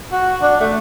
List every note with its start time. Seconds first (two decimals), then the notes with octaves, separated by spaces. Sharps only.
0.12 F#4
0.42 D4
0.60 A3